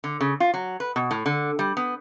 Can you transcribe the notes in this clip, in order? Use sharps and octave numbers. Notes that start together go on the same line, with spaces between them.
D3
C#3
F4
F#3
B4
B2
A2
D3
G3
B3